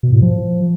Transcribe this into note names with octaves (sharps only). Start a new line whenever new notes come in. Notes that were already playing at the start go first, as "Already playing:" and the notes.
B2
A2
F3